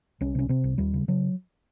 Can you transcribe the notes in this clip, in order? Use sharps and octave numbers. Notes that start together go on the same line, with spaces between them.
C2 C#4
C3 C#4
C3 C4
C2
D#2 G3
C#3
C#3 F#3